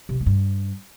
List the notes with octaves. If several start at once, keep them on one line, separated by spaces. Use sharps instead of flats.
C3
E3
A3
G2